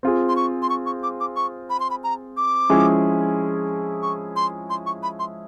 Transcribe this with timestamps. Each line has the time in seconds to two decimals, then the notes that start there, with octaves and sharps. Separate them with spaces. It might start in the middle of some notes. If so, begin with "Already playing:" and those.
0.03 C4 F4 G#4
0.29 C6
0.36 C#6
0.62 C6
0.70 C#6
0.86 C#6
1.03 D6
1.20 D6
1.36 C#6
1.70 B5
1.80 C6
1.90 B5
2.04 A#5
2.37 D6
2.70 F3 G#3 C#4 E4 G#4
4.02 C#6
4.36 C6
4.70 C6
4.86 C#6
5.03 B5
5.19 C6